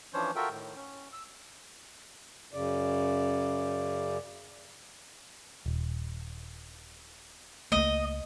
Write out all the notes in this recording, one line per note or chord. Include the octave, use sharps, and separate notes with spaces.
E3 F3 C#4 D4 C5 C#5
F4 F#4 A4 A#4 E5 G5
A2 D#3
C#4
E6
F#2 C#3 D5
D#1
C#2 A3 A#3 D#5